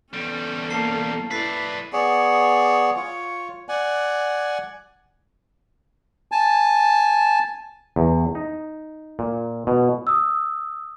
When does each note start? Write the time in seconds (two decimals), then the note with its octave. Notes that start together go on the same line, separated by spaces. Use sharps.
0.13 E2 G3 C#4 A4
0.70 A#3 A5 C7 G7
1.31 E4 B4 D5 A6 B6 C7
1.93 B3 G#4 C#5 D5
2.96 F4 C#5
3.69 D5 F#5 G#5
6.32 G#5 A5
7.96 E2
8.35 D#4
9.19 A#2
9.67 B2
10.07 D#6 E6